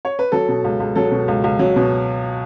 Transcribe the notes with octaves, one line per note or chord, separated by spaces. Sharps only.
C#5
B4
F#3 A4
B2
C#2
C#2
F#3 A4
B2
C#2
C#2
F#3
B2